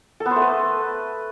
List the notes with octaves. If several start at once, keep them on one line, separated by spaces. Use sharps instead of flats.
A4
B3
C5
A3
B4